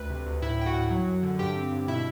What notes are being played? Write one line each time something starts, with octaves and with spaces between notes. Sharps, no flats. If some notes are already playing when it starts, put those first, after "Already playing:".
Already playing: D2 B4
C3
D2
A2 E4 E5
A2 G5
F#4 F#5
A2
F#3
F#2
D3
G2 G4 G5
C4
G2
B2 E4 E5